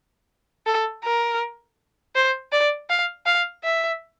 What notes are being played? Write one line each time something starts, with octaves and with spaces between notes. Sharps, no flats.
A4
A#4
C5
D5
F5
F5
E5